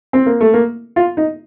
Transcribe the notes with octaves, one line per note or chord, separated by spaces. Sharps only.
C4
A#3
A3
A#3
F4
D#4